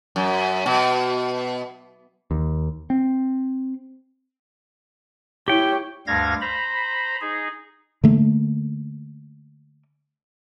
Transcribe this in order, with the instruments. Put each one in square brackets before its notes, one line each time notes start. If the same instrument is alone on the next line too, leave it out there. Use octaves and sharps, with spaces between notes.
[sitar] F#2
B2
[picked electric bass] D#2
C4
[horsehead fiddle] E4 C#5 [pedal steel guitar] G4 G5
[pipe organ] D2 G2 G3 F5 G#6 A#6
C5 A#5 B5
D#4 G#4
[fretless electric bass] D3 A3 A#3